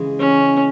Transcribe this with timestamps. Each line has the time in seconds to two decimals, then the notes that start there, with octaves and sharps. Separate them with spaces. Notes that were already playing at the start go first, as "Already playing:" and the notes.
Already playing: C#3 E3 G#3
0.20 C#4